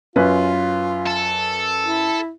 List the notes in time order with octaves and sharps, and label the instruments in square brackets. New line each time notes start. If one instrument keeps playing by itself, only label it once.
[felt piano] F#2 C#4 B4 [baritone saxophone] F4
[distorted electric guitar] A4
[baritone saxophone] E4